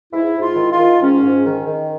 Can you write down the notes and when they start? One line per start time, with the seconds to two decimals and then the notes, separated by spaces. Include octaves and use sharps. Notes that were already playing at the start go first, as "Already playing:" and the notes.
0.13 G#2 E4
0.35 G#2
0.42 F4
0.56 D#3
0.72 F4
0.78 D#3
1.01 G#2 C#4
1.23 G#2
1.45 D#3
1.67 D#3